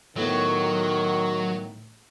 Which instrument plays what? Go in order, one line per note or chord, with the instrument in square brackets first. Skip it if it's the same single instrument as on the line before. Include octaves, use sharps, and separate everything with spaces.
[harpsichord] A2 B3 [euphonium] D#3 [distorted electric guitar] F#3